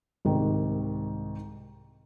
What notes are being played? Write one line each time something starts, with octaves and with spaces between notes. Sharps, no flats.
C2 G#2 D#3